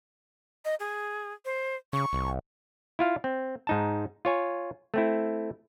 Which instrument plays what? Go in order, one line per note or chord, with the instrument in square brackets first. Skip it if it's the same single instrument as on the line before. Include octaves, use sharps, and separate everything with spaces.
[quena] D#5
G#4
C5
[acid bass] C#3 [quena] C#6
[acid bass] C2
[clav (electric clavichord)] E4 F4 F5
C4
G#2 D#4 A5
F4 C#5 G#5
A3 C4 E4